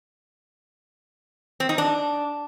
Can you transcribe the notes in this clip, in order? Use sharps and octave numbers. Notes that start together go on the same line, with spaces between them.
C4
D#4
D4